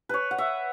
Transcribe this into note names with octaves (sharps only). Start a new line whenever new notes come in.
B4 C#5
F#5
E5